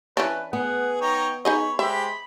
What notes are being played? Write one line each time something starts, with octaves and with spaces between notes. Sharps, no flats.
E3 C#4 D4 B4
B3 G#4 F#5
D#4 C#5 G5 A#5
D#4 G#4 C#5 D#5 B5
G#3 G4 C5 E5 B5